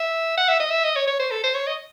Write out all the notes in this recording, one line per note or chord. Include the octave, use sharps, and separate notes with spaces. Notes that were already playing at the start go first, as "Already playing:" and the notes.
Already playing: E5
F#5
E5
D#5
E5
D#5
C#5
C#5
C5
A4
C5
C#5
D#5